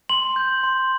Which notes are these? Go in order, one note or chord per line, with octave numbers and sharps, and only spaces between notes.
C6 F#7
G6
C6